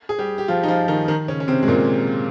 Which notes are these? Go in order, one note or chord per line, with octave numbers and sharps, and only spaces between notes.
G#4
G3 G4
G4
F3 F4
D#4
F3 F4
D#3 D#4
D#3 D#4
C#3 C#4
C#4
C3 C4
G#3
A#2 A#3